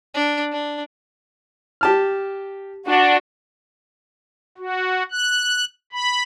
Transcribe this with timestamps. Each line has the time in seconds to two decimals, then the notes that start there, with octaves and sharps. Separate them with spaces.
0.14 D4
0.52 D4
1.81 G4 A5 F6
2.88 D4 F#4
4.58 F#4
5.12 F#6
5.93 B5